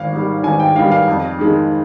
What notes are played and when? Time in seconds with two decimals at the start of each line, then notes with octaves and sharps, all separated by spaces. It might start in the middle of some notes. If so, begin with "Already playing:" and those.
Already playing: G#1 F5
0.12 G#2 D#3 G3
0.43 G#1 G#5
0.60 G5
0.75 G#2 D#3 G3 F5
0.92 F5
1.07 F2
1.39 D#3 G#3